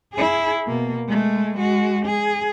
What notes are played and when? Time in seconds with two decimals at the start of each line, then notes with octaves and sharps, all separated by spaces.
0.14 E4 G#4
0.67 B2 A#3
1.09 G#3 A3
1.58 G#3 F#4
2.05 G#4